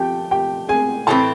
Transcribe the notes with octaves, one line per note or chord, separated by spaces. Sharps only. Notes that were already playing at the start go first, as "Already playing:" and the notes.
Already playing: F3 A3 G4 G5
G4 G5
G#4 G#5
A2 E3 A3 C4 A4 A5